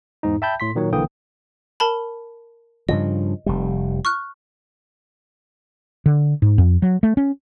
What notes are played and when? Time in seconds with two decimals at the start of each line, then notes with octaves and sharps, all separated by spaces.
0.23 E2 G#2 D#4
0.42 E5 G5 A5 B5 G6
0.60 A2 C6 B6
0.75 A#2 D#3 F#3 C#5
0.92 B1 D3 E3 A#3 G5 D#6
1.80 A#4 A5 B5
2.89 G2 C#3 F3 D#5
3.46 F1 G3
4.05 C#6 F6 F#6
6.06 D3
6.42 G#2
6.58 F2
6.82 F#3
7.03 A3
7.17 C#4